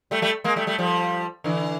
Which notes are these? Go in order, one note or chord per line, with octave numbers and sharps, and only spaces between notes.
G3 A3
G3 A3
G#3 A#3
G3 A3
G3 A3
F3 G3
D3 E3